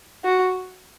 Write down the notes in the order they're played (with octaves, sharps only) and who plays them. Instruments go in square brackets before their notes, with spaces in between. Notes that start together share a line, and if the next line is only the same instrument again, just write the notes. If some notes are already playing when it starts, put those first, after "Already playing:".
[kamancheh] F#4